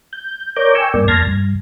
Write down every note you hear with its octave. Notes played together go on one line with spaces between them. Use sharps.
G6
A#4 C#5 D5 A#5 D6 G6
G5 G#5 C#6 E6
G2 A#3 D5
F2 A5 C6 F6 G#6 A#6
G2